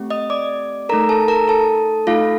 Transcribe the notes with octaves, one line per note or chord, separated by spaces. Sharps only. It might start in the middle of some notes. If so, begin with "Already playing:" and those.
Already playing: A3 C4 G4
D#5 D#6
D5 D6
A3 D#4 A4 A#4 A#5
A4 A5
A#4 A#5
A4 A5
A3 D#4 F4 A4 F5